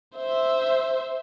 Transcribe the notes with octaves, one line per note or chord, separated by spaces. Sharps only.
C5 E5